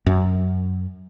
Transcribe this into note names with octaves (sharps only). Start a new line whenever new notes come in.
F#2